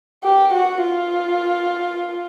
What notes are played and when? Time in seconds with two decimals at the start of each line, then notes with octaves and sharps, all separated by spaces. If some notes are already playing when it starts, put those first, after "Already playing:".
0.24 G4
0.53 F#4
0.82 F4